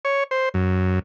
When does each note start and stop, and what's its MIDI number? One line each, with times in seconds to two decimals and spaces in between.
0.05 0.24 73
0.31 0.49 72
0.54 0.99 42